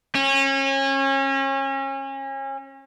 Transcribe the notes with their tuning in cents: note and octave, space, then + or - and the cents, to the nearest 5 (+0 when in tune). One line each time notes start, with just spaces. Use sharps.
C#4 -30